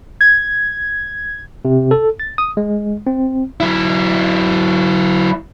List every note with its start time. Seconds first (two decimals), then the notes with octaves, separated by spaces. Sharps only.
0.21 G#6
1.65 C3
1.91 A4
2.20 A6
2.38 D#6
2.57 G#3
3.07 C4
3.60 F#3 E4